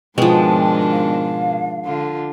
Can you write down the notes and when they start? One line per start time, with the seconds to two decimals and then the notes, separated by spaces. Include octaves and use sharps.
0.18 G#2 B2 D#3 F3 G#3 D4 G5
0.91 F5
1.85 D3 F4